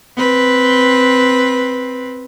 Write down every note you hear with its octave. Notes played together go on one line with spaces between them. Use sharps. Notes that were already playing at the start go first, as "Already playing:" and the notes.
C4 B4